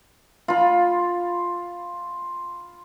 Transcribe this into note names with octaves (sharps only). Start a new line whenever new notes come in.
F4 B5